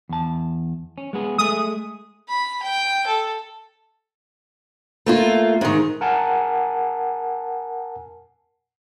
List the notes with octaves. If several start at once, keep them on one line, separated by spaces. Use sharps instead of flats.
E2 A5
C#4
G#3 B3 G#4
G#3 A3 G#4 D#6
B5
G5
A4
A3 A#3 F4
G#2 D#3
A#4 F#5 G#5 A5